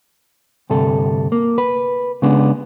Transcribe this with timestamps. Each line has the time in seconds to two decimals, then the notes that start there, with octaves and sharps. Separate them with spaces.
0.70 D2 G2 C3 A4
1.32 A#3
1.58 B4
2.22 C#3 G#3 B3 D4